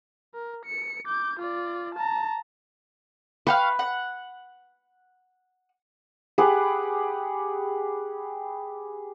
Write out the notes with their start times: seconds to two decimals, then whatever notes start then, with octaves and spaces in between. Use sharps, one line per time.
0.34 A#4
0.66 C#7
1.06 D6 G6
1.40 F4 D5
1.95 A5 A#5
3.47 B4 F5 G5 C#6
3.79 F#5
6.38 G4 G#4 B4 F#5